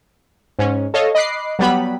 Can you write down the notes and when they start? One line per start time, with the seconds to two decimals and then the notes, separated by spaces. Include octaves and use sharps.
0.59 G#2 C#4
0.94 A4 C#5 D#5 F5
1.15 D#5 B5 D6 F#6 C7
1.59 F#3 G3 B3 B5